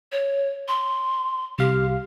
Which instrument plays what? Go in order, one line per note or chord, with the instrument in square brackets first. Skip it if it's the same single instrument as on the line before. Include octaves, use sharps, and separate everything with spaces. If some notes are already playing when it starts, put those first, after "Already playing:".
[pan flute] C#5
C6
[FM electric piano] C2 F5 [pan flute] G4